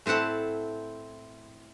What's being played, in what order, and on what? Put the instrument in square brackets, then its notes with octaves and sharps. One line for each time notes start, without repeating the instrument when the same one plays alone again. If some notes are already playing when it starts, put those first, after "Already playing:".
[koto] A2 C4 E4 F#5 A5